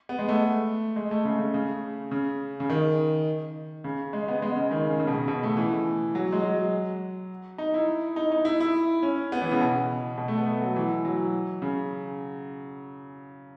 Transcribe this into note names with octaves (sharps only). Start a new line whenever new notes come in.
B3
G#3
A3
G#3
A3
C#3
C#3
C#3
C#3
C#3
D#3
C#3
G#3
B3
G#3
C#3
D#3
C#3
C#3
B2
C#3
B2
A3
E3
F#3
G#3
F#3
D#4
E4
D#4
D#4
E4
E4
C#4
B3
E3
C#3
B2
B2
A3
B3
A3
F#3
E3
F#3
C#3